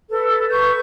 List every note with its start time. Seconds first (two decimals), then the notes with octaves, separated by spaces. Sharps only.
0.09 A4 B4
0.50 B4 C#6 G6